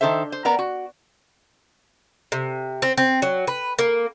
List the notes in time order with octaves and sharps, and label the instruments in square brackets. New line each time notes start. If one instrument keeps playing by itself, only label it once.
[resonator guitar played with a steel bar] D#3 D4 A4 C5 E5
C5
B3 A#4 D5 A#5
F#4
[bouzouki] C3
C4
C4
F#3
B4
A#3